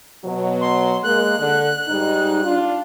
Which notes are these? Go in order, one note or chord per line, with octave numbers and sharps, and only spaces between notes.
B2 F#3
C6
G#3 A#3 F#6
D3
G#2 G3 D#4
D4 F4